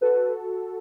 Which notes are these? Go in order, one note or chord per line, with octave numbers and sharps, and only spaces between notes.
F#4 A4 B4